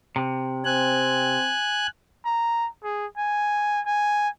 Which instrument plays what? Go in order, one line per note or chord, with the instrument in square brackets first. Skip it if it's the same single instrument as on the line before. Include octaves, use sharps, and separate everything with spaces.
[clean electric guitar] C3
[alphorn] C4 [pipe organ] G#5 F#6
[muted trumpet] A#5
G#4
G#5
G#5